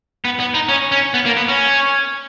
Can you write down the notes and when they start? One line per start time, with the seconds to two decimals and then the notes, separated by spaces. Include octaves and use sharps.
0.25 B3
0.40 B3
0.54 D#4
0.69 C#4
0.92 C#4
1.14 B3
1.26 A#3
1.37 B3
1.49 C#4